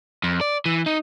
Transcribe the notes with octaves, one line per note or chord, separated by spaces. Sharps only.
F2
D5
E3
D#4